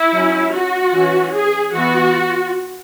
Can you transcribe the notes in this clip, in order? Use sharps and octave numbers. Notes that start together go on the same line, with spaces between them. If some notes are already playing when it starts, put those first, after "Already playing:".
Already playing: E4
F#3 C#4
F#4
E3 C#4
G#4
E3 B3 F#4